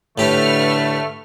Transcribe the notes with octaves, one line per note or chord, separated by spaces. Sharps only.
A2 D3 A3 G4 B4 F6